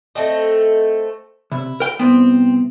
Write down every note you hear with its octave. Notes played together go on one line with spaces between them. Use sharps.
A3 C4 D#5
C3 E4
A#4 G5
C2 B3 C4